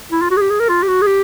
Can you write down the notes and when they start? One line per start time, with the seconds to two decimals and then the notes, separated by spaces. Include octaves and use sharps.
0.12 E4
0.22 F4
0.31 F#4
0.37 G#4
0.41 G4
0.50 G#4
0.60 A#4
0.69 F4
0.83 G4
0.88 F#4
1.02 G#4
1.07 G4